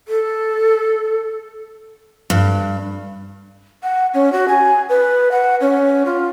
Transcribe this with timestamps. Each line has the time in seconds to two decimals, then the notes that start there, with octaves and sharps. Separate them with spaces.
0.08 A4
2.30 G2
3.83 F#5
4.14 C#4
4.33 F#4
4.48 G#5
4.89 B4
5.31 F#5
5.61 C#4
6.05 F4